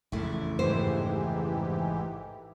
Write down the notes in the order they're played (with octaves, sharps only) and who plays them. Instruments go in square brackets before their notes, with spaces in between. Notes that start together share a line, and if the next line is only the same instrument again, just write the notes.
[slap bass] A1 F2 C#3 [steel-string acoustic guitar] A3 E4
[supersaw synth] G#2 E3 G4 [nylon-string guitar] C5